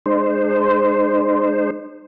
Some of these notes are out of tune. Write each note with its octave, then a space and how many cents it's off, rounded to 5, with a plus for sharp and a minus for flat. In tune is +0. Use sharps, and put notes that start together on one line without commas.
G#3 +0 D#4 -40 C5 -10